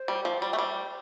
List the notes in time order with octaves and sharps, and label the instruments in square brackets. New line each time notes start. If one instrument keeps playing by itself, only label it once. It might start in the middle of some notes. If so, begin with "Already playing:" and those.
Already playing: [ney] C5
[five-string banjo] G3
F3
G3
A3
[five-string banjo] G3 [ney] C5